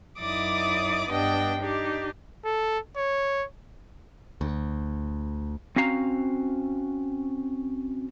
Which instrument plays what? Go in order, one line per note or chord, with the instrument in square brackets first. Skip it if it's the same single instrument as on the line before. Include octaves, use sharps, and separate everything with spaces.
[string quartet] F#2 D#4 E4 D5 D6 D#6
G2 B3 D4 D#5 G5
D4 D#4 G4
[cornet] A4
C#5
[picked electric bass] D2
[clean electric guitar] C4 C#4 F#4 F5 A#5